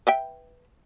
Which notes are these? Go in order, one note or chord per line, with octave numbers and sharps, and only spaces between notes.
B4 E5 G5